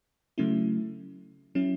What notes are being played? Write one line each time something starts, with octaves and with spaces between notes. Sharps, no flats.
C#3 F#3 A3 C#4 E4
F#3 C#4 E4